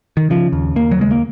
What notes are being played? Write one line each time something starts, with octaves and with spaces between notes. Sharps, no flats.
D#3
C#3 F3
D#2
D#2 A#3
F#3
C#3 G#3
A#3